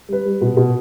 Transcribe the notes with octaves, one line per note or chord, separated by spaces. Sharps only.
G3 B4
G3
B2
B2